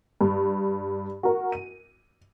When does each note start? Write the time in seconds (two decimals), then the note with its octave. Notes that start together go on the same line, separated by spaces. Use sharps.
0.21 G2
1.23 F#4 A#4
1.52 D#7